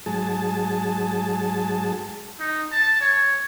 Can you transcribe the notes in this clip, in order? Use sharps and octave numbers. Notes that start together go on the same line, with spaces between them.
G#2 F#3 G#4 A5
D#4
A5
C#5